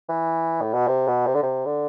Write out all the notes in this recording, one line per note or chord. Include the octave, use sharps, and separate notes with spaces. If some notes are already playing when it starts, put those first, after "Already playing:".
E3
A2
B2
C3
B2
C3
D3
C3
D3